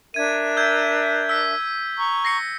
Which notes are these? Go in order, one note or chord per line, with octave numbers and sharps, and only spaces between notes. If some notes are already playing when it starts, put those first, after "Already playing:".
D4 A#4 E5 G#6 D#7
E6 G6 G#6
E6 B6
A#5 C#6
A#6 C7 C#7